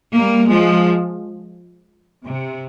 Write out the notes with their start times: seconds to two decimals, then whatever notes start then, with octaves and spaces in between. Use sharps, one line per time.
0.15 G3 A#3
0.50 F3 G#3
2.24 C3